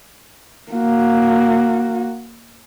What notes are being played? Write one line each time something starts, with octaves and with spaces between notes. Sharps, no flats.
A#3 F#4